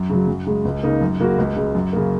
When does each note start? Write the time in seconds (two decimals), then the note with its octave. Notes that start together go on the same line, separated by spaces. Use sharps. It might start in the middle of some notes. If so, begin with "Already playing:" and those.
Already playing: F#2
0.09 C#3 F#3
0.27 F#2
0.47 C#3 G#3
0.65 C#2
0.83 C#3 A#3 D#4
1.01 F#2
1.20 C#3 A#3 F#4
1.38 C#2
1.56 C#3 G#3
1.75 F#2
1.93 C#3 A#3